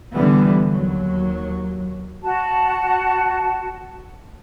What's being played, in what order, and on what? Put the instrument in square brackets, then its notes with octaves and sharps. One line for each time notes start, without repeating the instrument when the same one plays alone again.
[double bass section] D3 E3 G3 B3
D#2 F#3
[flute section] F#4 A5